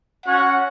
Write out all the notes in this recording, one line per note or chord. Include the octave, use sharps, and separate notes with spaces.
C#4 F#4 C#5 F#5